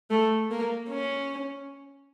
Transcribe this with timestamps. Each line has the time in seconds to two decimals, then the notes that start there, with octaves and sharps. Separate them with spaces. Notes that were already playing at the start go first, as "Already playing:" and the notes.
0.11 A3
0.51 A#3
0.90 C#4